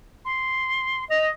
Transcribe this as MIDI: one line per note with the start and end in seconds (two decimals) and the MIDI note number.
0.25 1.04 84
1.10 1.31 75
1.10 1.25 101